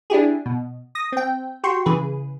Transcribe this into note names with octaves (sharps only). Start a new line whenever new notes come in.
D4 E4 G4 G#4
B2
D#6 A#6
C4 G5
F#4 G4 G5 C6 C#6
C#3 E3 G#4 B4